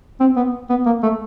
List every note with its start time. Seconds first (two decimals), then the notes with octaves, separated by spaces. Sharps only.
0.20 C4
0.36 B3
0.70 B3
0.86 A#3
1.03 A3